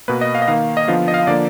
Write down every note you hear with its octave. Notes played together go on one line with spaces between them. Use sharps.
B2 A#3 B4
D#5
F5
D#5
D#3 A#3 F5
D#5
D3 F3 B3 F5
D#5
F5
D3 F3 A#3 D5